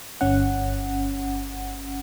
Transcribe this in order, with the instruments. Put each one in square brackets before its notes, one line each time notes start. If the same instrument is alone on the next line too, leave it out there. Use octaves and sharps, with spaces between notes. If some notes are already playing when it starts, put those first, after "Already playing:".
[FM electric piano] G1 C#4 F#5